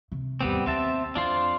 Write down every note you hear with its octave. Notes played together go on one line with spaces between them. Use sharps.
C3
G#1 E2 G3 B3 C4
D#2 C4 E5 A5
F2 D4 F4 C5